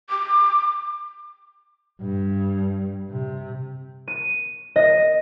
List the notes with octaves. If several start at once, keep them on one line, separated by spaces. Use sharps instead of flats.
D6
G2
C3
D#7
D#5